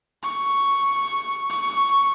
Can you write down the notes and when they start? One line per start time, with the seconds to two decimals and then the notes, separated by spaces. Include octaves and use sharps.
0.23 C#6
1.50 C#6